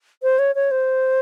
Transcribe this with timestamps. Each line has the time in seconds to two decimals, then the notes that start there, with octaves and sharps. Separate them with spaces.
0.23 C5
0.39 C#5
0.55 C#5
0.71 C5